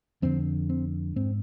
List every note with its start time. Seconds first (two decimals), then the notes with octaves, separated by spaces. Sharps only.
0.22 F2 D3 C4
0.70 C4
1.16 G#2 C4